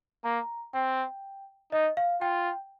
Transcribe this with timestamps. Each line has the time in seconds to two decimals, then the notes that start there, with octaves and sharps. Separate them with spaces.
0.24 A#3 A#5
0.73 C4 G5
1.72 D#4 D#5
1.97 F5
2.21 F4 G5